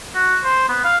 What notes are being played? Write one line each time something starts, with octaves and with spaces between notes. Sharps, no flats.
F#4
C5
B3
F5